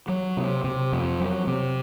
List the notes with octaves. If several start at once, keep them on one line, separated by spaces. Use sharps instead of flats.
F#3
C3
C3
F2
F#3
C3